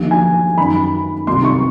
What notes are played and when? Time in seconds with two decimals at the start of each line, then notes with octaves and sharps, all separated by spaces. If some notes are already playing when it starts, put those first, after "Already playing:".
Already playing: D#2 D3 F3
0.11 G#5
0.58 F#2 D#3 B5
1.27 C2 C3 D#3 C6
1.45 C#6